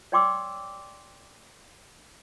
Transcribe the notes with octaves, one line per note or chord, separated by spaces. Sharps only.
C#5 D5 G5 C6 D6 E6